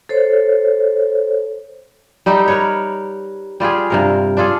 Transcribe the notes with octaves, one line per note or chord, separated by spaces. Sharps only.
A4 C5 C#5
G3 D#4 G4 E5
A#4 B4 C#5
G3 F4 G4 G#4
G2 C3 A#4
D4 F4 G#4 A4